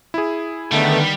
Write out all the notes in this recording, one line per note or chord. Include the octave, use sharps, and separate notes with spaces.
E4 G#4
D3 D#3 G3 A3 B3